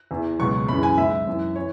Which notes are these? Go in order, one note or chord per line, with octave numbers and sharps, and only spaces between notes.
E2 E3
C#2 B2 F#3 C#6
F#2 C#3 E3 B5
G#5
G#2 F#3 E5
F#2 E3
E3 C#5